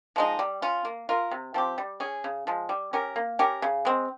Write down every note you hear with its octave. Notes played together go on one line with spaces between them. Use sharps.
F3 G#3 D#4
G3
C#4 F4
A#3
F4 A#4
C3
F3 C4 G4
G3
C#4 G#4
C#3
F3 G#3
G3
C#4 G4 A#4
A#3
C#4 G4 A#4
C#3
G#3 C4